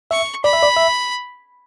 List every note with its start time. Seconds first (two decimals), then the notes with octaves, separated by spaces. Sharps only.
0.11 E5 C#6
0.44 D5 B5
0.53 E5
0.63 D5
0.76 E5